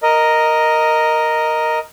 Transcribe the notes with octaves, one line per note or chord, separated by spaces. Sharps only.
A#4 D#5